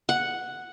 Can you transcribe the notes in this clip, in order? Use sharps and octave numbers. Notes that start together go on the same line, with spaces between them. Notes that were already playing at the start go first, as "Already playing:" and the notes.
F#5